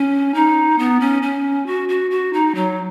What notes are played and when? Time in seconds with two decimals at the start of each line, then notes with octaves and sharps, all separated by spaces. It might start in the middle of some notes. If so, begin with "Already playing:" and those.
Already playing: C#4
0.34 D#4
0.79 B3
1.01 C#4
1.22 C#4
1.67 F#4
1.89 F#4
2.11 F#4
2.33 D#4
2.55 F#3